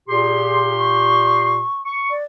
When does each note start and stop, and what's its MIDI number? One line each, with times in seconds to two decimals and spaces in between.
0.09 1.63 46
0.09 1.63 67
0.09 0.73 68
0.09 1.63 84
0.78 1.81 85
1.85 2.11 85
2.10 2.24 74